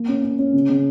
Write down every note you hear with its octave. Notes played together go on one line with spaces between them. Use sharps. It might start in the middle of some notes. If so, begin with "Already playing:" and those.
Already playing: A#3
C#4
C#4
C#4
C#3
C#3